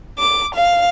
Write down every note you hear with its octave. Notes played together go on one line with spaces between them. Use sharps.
D6
F5